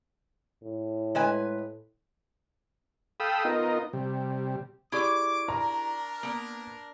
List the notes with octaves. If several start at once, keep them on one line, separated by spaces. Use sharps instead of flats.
A2
G#3 B4 G#5
A4 F5 G5 B5 D#6 E6
B3 D#4 F4 A#4 D#5
C3 G3
E4 G4 G#4 D5 C#6 D6 G#6
D4 A#4 A#5
A#3 B3